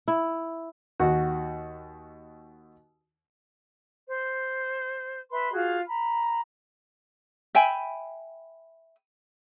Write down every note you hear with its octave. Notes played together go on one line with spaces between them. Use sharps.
E4
D#2 F#4
C5
B4 E5 B5 C6
F4 F#4 G#4
A#5 B5
E5 G5 G#5 B5